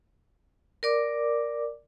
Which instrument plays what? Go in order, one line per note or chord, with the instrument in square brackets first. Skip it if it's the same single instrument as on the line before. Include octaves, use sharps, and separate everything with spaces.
[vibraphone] A#4 D5 D6